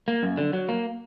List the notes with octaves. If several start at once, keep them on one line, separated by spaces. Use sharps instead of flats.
A#3
F#2
D3
F#3
A#3